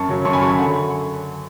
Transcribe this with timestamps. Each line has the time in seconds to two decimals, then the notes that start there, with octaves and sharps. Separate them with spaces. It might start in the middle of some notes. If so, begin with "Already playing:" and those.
Already playing: F#2 A5 C#6
0.09 C#3 F#3
0.25 F#2 A5 C#6
0.33 G#5 B5
0.41 C#3 F#3 A5 C#6
0.50 G#5 B5
0.58 D3 F#5 A5